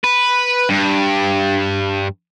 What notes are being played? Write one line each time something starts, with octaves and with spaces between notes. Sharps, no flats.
B4
G2